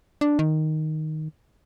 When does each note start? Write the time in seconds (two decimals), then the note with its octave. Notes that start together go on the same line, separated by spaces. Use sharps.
0.21 D4
0.39 D#3